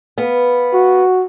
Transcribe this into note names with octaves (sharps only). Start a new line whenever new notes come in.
B3 F5
F#4